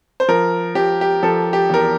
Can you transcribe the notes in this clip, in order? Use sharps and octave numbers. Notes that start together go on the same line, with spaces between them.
C5
F3 A#4
F3 G4
G4
F3 A4
G4
E2 A#4